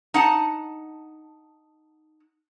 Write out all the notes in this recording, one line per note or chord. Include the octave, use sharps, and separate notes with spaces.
D#4 F#5 A5